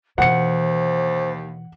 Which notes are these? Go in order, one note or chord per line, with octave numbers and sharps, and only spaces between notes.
D#2 B2 E3 C5 F#5 C#7